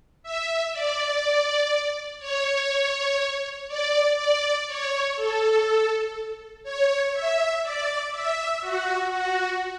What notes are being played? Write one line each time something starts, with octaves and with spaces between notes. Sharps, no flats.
E5
D5
C#5
D5
D5
C#5
A4
C#5
E5
D5
E5
F#4
F#4